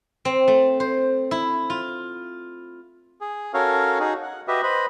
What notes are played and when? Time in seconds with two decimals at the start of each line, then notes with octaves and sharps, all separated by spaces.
0.25 C4
0.48 A3
0.80 C5
1.31 E4
1.70 F4
3.21 G#4
3.54 C#4 F#4 A4 A#4 C#5 F5
4.00 D#4 F#4 G#4
4.23 F#5
4.48 F#4 G4 B4 D#5 E5
4.63 B4 C5 D#5 B5